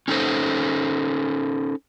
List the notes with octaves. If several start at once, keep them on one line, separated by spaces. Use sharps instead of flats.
C#4 D#4 A4 C5